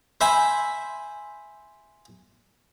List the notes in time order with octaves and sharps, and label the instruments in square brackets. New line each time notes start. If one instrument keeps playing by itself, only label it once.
[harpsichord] C5 E5 G#5 B5